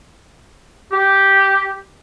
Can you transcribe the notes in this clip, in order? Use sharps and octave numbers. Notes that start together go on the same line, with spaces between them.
G4